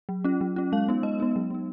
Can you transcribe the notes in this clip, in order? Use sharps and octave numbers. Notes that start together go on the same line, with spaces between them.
F#3
C#4 F4
F#3
C#4 F4
G#3 F5
B3 D#4
G#3 D#5
B3 D#4
F#3
B3 D#4